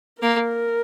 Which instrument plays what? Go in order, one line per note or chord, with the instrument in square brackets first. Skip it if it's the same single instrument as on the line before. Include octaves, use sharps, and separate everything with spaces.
[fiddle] A#3 [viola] A#4